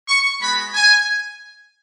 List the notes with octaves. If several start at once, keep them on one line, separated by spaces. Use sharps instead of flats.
C#6
G#3 B3 F#4 B5
G#5